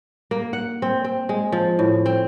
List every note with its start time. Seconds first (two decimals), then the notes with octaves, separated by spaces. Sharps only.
0.31 A#3
0.53 F#5
0.82 C4
1.04 C4
1.29 G#3
1.52 F3
1.79 A2
2.06 C4